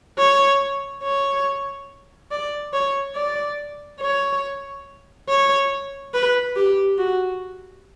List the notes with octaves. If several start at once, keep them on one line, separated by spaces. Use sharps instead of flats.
C#5
C#5
D5
C#5
D5
C#5
C#5
B4
G4
F#4